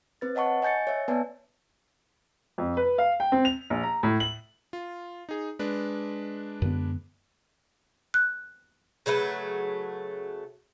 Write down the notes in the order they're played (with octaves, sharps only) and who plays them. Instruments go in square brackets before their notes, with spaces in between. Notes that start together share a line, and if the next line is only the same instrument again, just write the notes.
[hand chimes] C4 B4 A6
C#5 D#5 F#5 A5 C#6
D#5 G#5 G6 A6 C#7
C#5 E5
B3 B4 D5 G#5 A5
[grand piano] F2
B4
F5
G5
C4
F7
A#1
A#5
A2
F#7
[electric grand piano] F4
D#4 G#4
G#3 D4 B4
[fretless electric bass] F#2 D3 B3
[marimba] F#6
[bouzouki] C#3 F#3 A3 B4